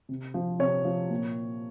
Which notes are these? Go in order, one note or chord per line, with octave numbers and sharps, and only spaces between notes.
C3
F3
C3 C#5
F3
A#2